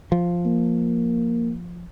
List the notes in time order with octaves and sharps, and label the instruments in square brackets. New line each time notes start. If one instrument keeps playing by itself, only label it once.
[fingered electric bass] F3
[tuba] A#3